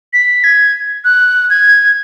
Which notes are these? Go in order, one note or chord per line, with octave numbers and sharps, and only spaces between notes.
B6
G#6
F#6
G#6